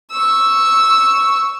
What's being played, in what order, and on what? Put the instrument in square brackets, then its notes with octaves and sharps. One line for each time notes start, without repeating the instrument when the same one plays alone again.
[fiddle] C#6 E6